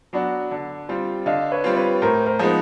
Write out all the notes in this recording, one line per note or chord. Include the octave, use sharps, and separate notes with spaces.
F#3 B3 D4 F#4
D3
G3 C4 F4
D3 D#5 F5
B4 C#5
G3 C4 F4
B4 C#5
A2 A#4 C5
A#4 C5
F3 G#3 B3 D#4